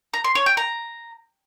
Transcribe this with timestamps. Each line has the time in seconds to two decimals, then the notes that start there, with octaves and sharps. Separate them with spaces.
0.14 A#5
0.24 C6
0.35 C#5
0.46 G5
0.57 A#5